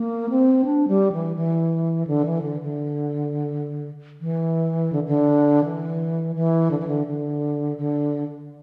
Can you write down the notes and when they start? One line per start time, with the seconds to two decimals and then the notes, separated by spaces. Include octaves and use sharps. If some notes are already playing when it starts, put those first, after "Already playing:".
Already playing: A#3
0.30 C4
0.65 D4
0.88 G3
1.13 E3
1.36 E3
2.07 D3
2.25 E3
2.42 D3
2.61 D3
4.21 E3
4.93 D3
5.07 D3
5.64 E3
6.35 E3
6.71 D3
6.79 E3
6.88 D3
7.07 D3
7.78 D3